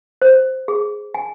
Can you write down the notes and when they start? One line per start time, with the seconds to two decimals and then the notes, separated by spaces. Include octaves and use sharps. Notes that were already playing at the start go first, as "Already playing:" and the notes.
0.22 C5
0.68 G#4
1.15 G#5